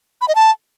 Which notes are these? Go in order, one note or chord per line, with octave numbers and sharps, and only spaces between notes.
B5
D#5
A5